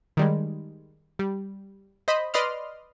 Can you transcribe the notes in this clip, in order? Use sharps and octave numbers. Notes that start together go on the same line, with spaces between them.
D#3 G3 G#3
G3
C5 D#5 B5
B4 D5 D#5 C6 D#6 F6